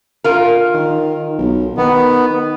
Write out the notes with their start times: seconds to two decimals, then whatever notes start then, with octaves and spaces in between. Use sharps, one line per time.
0.24 F4 A#4
0.74 D#3
1.39 B1
1.77 D#3 B3